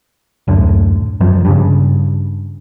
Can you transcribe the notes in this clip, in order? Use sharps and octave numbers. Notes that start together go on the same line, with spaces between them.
D1 F#2 A2 D3
F#2 F3
G2 C#3